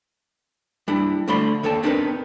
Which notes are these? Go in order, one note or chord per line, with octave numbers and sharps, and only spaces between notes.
G3 D4 E4
D3 A3 D5 B5 C6
D#2 A4 D5 G5 A5
B3 C4 D4 D#4 A#4 B4